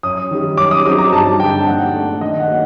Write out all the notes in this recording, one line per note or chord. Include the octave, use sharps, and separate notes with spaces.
F#2 D#6
D#3 G3
F#2 D6
D#6
F#3 C4 D#4 D6
A#5
G2 A5
D3 G3 C4 D#4 G5
A#2 F#5
A3 D4
D#3 D#5
F#5
F#3 A#3